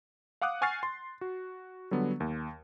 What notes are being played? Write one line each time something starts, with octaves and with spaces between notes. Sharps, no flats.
F5 F#5 D6 D#6 F#6
F#5 G#5 C#6 F6 A6 C7
C6
F#4
D3 F#3 G3 B3
D#2